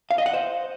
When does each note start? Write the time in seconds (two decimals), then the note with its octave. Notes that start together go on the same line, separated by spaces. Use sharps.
0.11 F5
0.18 D#5
0.26 F#5
0.34 C5